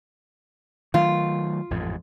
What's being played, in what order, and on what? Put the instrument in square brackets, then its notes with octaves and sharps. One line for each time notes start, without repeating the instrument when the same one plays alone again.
[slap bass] D#3 F#3 A3 [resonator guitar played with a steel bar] F4
[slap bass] A1 F2 G#2